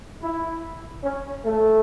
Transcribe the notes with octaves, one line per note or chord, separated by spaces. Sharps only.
E4
C#4
A3